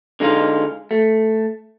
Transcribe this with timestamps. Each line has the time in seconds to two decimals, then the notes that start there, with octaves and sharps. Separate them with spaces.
0.20 D3 G#3 D#4 F4
0.91 A3